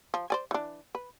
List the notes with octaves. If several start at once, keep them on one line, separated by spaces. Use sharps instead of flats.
F3
C5 D5 G#5
E3 D4
B4